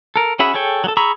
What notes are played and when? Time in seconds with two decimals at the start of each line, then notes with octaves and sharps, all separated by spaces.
0.16 A4 A#4
0.39 C#4 F#4 G#4 E5 B5
0.54 G#4 A4 C#5 G5
0.84 F#3 A4
0.97 G#4 A#5 B5 C#6 E6